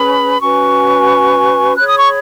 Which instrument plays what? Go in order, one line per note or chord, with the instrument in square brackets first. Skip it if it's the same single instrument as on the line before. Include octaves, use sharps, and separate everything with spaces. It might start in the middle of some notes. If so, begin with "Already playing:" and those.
Already playing: [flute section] C#4 G#4 B4 [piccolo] B5
[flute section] C#4 F#4 B4 G#5 [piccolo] C#6
[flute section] G#4 C#5 B5 [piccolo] F#6
[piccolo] D#6
C#6